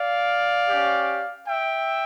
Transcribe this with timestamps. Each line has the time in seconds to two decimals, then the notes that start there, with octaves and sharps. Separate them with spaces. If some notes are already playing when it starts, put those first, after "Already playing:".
Already playing: D5 F5
0.69 C#4 G4
1.47 E5 G5